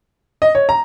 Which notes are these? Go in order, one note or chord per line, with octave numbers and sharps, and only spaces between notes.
D#5
C#5
A#5